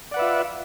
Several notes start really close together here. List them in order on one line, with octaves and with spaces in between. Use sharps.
D5 F#5 B4 E5 F4